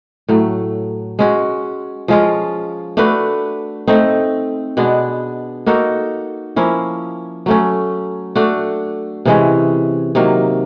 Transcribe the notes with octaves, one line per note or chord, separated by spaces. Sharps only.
A2 F#3 A3
G#3 C#4 F#4
F3 G#3 C#4 F4
A3 D4 F#4 B4
A3 C4 D#4
B2 G#3 B3 D4
A#3 D#4 F#4 A4
F3 A#3 C#4 E4
F#3 A3 C#4
A3 D4 F#4
C3 E3 G#3 C#4
C3 D#3 F#3 A#3